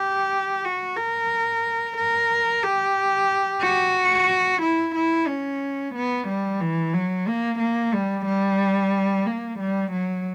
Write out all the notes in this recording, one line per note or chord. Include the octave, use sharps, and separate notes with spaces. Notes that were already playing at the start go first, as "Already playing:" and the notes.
Already playing: G4
F#4
A#4
A#4
G4
F#4
E4
E4
C#4
B3
G3
E3
F#3
A#3
A#3
G3
G3
A#3
G3
F#3